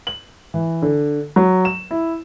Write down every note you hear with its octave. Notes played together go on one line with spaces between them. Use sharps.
F#7
E3
D3
F#3
E7
E4